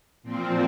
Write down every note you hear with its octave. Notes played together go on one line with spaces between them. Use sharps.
A#2 F3 C4